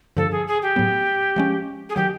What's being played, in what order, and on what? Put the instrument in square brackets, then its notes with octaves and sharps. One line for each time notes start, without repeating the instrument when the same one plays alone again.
[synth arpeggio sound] G2 D3 F3 [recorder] A4
[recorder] G#4
G#4
G4
[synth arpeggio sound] A2 F#3 B3
F3 G#3 C#4
[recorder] G#4
[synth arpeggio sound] D#3 F#3 [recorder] G4